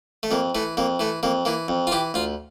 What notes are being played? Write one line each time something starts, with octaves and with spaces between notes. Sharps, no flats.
A3
F2 A#3
E3 A3
F2 A#3
E3 A3
F2 A#3
E3 A#3
F2
F4
E3 G4
D2 F4